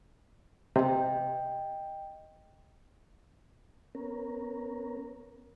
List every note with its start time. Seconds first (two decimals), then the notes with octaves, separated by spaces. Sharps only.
0.76 C3 D#5 G5
3.95 B3 C#4 A#4